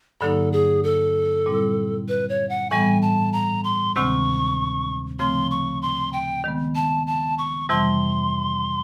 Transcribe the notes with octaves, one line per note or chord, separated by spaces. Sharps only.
G2 D3 F#3 A#3 D#4 A4
G#4
A4
A#2 G3 C4 E4
B4
C#5
F#5
A2 E3 G3 B3 G#5
A5
A#5
C6
D2 C3 D#3 G#3 C4 C#6
C#3 F3 A3 C4 C6
C#6
C6
G5
D#3 G#3 B3
A5
A5
C#6
F2 C3 E3 G3 C6